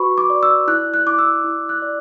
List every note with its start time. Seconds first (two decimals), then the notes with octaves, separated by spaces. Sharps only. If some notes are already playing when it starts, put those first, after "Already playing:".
Already playing: F#4 B4 B5 C#6
0.18 D6
0.30 D5
0.43 E6
0.68 E4 F#6
0.94 F#6
1.06 E4 D6
1.19 E6
1.44 E4
1.69 F#6
1.82 D5